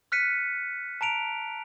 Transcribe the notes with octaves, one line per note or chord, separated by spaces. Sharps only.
F6 F#6 B6 C#7 D#7
A5 A#5 D7 F7